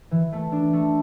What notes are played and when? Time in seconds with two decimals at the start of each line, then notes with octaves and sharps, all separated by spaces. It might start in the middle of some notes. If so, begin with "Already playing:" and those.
0.11 E3
0.32 A3
0.52 D4
0.73 A3